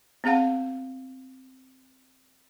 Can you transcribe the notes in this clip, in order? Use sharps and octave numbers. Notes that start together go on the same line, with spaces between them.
B3 C4 G#4 F5 F#5